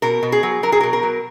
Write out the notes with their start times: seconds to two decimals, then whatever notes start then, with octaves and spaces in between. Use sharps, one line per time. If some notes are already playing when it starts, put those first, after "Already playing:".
0.02 B2 A#4
0.23 B2
0.32 G#4
0.43 F#3
0.63 F#3 A#4
0.72 G#4
0.80 B2 A#4
0.93 A#4
1.03 F#3